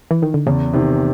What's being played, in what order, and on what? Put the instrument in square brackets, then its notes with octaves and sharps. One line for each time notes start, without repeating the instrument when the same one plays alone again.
[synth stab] E3
D#3
D3
[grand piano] E2 [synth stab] C#3
[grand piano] C3 D#3